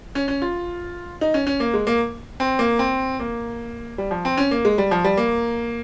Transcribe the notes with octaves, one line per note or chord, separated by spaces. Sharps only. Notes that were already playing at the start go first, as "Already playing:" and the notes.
C#4
C#4
F4
D#4
C#4
C#4
A#3
G#3
A#3
C4
A#3
C4
A#3
G3
F3
C4
C#4
A#3
G#3
G3
F3
G3
A#3